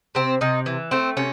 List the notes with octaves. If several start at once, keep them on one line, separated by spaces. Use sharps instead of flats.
C3 C4
C3 D#4
E3
A3 C4
C3 C#4